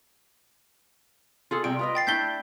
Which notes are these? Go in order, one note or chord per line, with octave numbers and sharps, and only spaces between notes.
F4 G#4 A4
C3 G3 G5 D7
F4 B4 D#5
G5 A6 C7
A3 D4 E4 G6 B6 G7